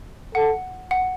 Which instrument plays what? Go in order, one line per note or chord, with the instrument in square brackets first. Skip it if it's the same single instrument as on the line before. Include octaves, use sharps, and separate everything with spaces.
[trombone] A4 [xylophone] F#5
[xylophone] F#5